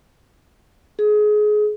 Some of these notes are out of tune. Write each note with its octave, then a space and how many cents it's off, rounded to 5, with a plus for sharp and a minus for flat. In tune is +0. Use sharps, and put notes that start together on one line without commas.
G#4 +25